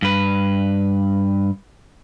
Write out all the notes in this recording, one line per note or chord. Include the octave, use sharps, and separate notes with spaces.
G2 B4